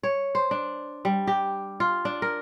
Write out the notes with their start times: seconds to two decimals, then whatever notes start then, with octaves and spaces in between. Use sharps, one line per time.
0.03 C#5
0.35 C5
0.51 D4
1.05 G3
1.27 G4
1.80 F4
2.05 D4
2.22 A#4